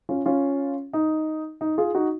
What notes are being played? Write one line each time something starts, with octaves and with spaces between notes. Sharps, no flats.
C#4 F4
C#4 F4
D#4
D#4
F4 G#4
D#4 F#4